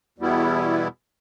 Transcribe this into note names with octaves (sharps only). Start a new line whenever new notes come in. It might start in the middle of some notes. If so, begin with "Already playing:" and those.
E2 B2 G3 B3 E4